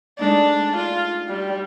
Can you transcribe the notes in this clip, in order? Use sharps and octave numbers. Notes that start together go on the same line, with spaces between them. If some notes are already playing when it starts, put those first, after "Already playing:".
G#3 A3 D4 D#4
F4
G3